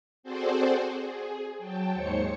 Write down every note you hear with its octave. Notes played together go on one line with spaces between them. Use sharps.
C4 F#4 G#4 A4 C5 D5
G#4
F#3 G5 A5
D#2 G#2 C5 C#5 C#7